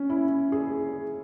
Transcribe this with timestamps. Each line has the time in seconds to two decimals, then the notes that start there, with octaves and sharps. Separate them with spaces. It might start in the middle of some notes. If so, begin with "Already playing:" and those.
Already playing: C#4
0.10 E4
0.52 G#4